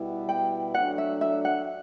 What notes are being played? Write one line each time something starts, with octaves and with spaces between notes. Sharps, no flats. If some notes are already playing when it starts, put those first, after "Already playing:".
Already playing: B2 G3 B3 E4
G5
F#3 A3 D4 F#5
E5
E5
F#5